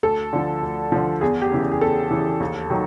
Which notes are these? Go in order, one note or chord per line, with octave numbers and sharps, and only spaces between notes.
D2 A4
D3 F3
D2
D3 F3
E2 G#4
G4
C#3 E3
G#4
E2 A4
C#3 E3
D#2
D#3 F#3